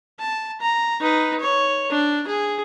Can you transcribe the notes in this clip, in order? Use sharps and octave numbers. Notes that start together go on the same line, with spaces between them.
A5
A#5
D#4 B4
C#5
D4
G#4